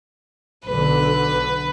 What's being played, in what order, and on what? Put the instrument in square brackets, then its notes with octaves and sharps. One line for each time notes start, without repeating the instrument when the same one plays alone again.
[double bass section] B1 D3 [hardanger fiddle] B4